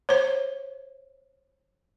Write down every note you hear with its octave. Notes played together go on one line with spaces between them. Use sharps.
C5 C#5